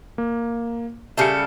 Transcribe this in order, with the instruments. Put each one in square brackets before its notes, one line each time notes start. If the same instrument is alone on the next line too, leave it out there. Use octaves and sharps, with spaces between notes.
[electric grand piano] A#3
[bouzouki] C#3 G3 A4 [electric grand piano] E5 C#7